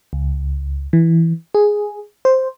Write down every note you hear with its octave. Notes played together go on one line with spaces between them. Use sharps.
C#2
E3
G#4
C5